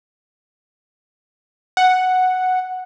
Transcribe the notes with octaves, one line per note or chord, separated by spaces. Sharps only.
F#5